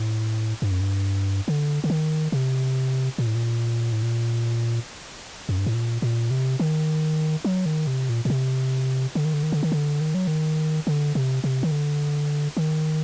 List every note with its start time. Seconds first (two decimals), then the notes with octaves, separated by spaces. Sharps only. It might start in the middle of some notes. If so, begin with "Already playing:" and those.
Already playing: A2
0.62 G2
0.71 F#2
0.81 G2
1.48 D3
1.84 D3
1.90 D#3
2.32 C3
3.18 A#2
3.27 A2
3.35 A#2
3.92 A2
4.03 A#2
5.49 F#2
5.58 G2
5.66 A2
5.74 A#2
6.02 A#2
6.31 C3
6.60 D#3
7.45 F#3
7.66 D#3
7.87 C3
8.09 A#2
8.25 A#2
8.30 C3
9.15 D3
9.25 D#3
9.34 D3
9.43 D#3
9.52 D3
9.63 D#3
9.72 D3
10.01 D#3
10.14 F#3
10.27 D#3
10.87 D3
11.15 C3
11.44 C3
11.63 D#3
11.71 D3
12.57 D#3